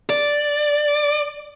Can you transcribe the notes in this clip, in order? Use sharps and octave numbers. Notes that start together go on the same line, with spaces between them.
D5